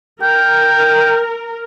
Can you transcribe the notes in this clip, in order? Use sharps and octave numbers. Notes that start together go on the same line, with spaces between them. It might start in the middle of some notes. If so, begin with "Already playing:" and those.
A#4 G5